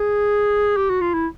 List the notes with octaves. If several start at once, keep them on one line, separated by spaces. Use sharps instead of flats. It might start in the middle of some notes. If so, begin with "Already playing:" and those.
Already playing: G#4
G4
F#4
F4
E4